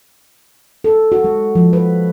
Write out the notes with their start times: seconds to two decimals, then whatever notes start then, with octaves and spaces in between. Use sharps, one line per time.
0.84 A4
1.12 F#4
1.24 G#3
1.55 F3
1.73 B4